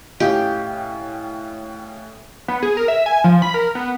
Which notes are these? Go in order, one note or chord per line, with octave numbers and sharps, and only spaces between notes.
A2 C#4 G4 D#5 F5 G5
B3
G#4
A#4
E5
G#5
F3
B5
A#4
B3